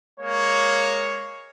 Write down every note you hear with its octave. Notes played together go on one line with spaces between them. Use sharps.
G#3 A#3 C#5